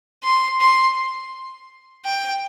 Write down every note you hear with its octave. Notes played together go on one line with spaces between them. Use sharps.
C6
C6
G5